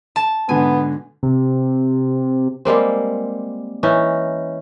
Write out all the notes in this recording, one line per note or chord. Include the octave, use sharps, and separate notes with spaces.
A5
G#2 B2 D3 B3 G#5
C3
G3 G#3 A#3 C4
E3 C#4 D#4